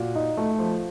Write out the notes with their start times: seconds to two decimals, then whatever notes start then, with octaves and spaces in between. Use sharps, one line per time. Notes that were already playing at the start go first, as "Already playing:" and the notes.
Already playing: A#2 F#4
0.15 D#4
0.37 A3
0.58 F3